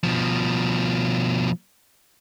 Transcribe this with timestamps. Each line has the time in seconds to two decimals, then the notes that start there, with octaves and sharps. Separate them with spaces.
0.03 B2 F3